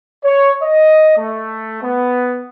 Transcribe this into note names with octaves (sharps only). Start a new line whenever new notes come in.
C#5
D#5
A3
B3